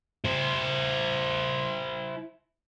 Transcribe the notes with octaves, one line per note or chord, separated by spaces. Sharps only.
E4 C5